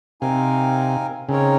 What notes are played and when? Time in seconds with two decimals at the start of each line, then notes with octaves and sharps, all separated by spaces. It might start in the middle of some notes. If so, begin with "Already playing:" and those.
0.21 C3 C4 D#4 A#4 F5 G#5
1.28 C#3 C4 D#4 A#4 C#5